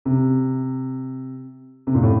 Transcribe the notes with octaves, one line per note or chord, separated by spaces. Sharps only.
C3
C3
A#2
A2